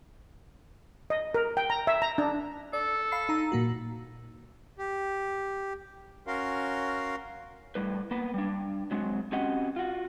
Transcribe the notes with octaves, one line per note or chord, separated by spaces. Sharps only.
D#5
A#4
G5
A#5
E5
A#5
D4
A4 D5
F5 B5 C7
D#4 A#5
A#2 A#3 F#4
G4
C#4 F#4 A#4 F5 C6
A2 G3 B4
A#3 B3 B4
G3 D4
F#3 G#3 C4 F#4
C4 C#4 F#4 G4 D#5 F#5
F4 F#4